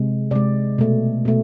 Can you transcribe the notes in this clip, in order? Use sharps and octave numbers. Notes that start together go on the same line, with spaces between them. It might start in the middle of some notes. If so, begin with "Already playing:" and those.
Already playing: C3 G#3
C3 G#3 D5
B2 A3
B2 A3